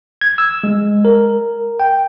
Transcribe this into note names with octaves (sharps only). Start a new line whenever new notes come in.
G#6
E6
G#3
A#4
G5